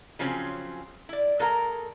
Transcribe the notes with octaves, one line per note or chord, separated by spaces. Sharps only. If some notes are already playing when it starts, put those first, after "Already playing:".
C#3 F3 F#3 C4 C#4
E4 D5
G#3 A4 A#4 F#5 A#5